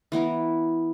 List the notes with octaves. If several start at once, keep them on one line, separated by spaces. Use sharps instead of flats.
E3 B3 E4 A#4